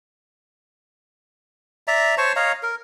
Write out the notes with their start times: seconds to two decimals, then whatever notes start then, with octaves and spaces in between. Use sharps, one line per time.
1.87 D5 E5 A#5
2.18 C5 C#5 A5 C#6
2.36 C#5 D#5 F5 A#5
2.63 A#4